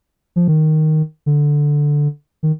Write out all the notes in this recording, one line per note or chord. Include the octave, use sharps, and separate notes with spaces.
F3
D#3
D3
D#3